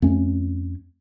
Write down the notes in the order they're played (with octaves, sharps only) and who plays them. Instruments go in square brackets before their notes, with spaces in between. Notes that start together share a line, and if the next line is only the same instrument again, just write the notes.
[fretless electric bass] F2 A3 C#4